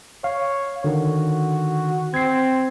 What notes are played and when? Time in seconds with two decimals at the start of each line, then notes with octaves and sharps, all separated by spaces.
0.24 C#5 F5
0.84 D3 D#3 F#4
2.14 C4 G#6 C7